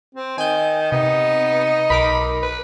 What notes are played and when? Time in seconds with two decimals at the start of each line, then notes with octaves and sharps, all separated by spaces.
0.15 C4
0.38 D#3 G#5 G6
0.92 C3 B3 D#4
1.90 B1 A#4 B5 D6
2.43 B4